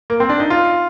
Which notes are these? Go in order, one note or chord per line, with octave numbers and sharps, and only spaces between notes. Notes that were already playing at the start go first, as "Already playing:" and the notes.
A#3
C4
D4
D#4
F4